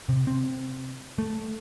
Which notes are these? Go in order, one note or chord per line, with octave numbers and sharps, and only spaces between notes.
C3
C4
A3